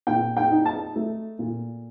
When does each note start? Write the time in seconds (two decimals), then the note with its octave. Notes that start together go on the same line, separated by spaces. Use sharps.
0.07 A#2 G5
0.37 G5
0.51 D#4
0.65 A5
0.96 A3
1.39 A#2